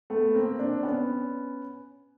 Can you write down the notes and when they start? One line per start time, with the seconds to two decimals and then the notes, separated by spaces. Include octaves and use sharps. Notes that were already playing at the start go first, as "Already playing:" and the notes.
0.10 A3 B3
0.34 A#3 C4
0.59 C4 D4
0.83 B3 C#4